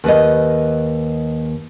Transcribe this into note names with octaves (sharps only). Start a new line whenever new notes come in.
D#2 B4 D#5